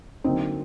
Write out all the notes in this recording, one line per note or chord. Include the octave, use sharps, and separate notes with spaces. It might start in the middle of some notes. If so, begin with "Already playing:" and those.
D3 F#3 A#3 C4 D#4